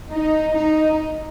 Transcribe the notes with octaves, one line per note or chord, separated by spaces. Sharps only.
D#4
D#4